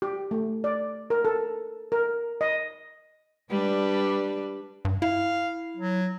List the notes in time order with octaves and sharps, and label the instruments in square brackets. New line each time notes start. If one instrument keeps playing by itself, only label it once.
[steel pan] G4
A3
D5
A#4
A4
A#4
D#5
[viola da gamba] G3 D4 B4
[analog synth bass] G2
[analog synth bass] E4 [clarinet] F5
[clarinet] F#3